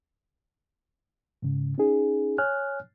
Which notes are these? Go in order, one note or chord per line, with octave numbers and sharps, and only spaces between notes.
G#2 C#3
C#4 D#4 G#4
C#5 G#5 F6 F#6